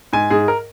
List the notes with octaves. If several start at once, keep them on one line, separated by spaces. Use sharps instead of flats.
G#2 G#5
G#2 G#4
A#4